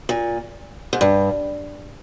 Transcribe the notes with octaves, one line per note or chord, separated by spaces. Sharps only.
A#2
G#2
G2